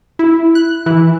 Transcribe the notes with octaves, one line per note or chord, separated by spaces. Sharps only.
E4
F#6
E3